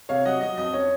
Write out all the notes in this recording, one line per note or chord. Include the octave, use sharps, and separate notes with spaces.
C3 C#5 F5
F#3 D#5 F#5
F#3 D#5
F2 D#5
C#4 C#5